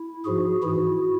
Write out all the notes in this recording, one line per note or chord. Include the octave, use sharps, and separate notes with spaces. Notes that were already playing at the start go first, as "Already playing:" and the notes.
Already playing: E4
G#2 F3 F#4 G#4
G#2 E3 E4 F#4